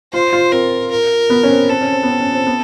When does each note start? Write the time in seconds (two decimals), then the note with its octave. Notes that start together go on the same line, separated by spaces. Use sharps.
0.13 F4 C5
0.33 F4
0.52 C4 A#4
0.91 A#4
1.30 B3
1.43 C#4
1.49 C4
1.68 C4 A4
1.81 C#4
1.92 C4
2.03 B3
2.08 C4
2.21 C#4
2.33 C4
2.47 B3